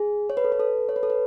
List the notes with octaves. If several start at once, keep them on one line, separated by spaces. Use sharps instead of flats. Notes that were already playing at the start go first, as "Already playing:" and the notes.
Already playing: G#4
C#5
B4
A4
B4
A4
C#5
B4
A4
B4